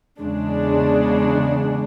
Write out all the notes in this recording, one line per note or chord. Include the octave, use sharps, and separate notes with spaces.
E2 C#3 G#3 D4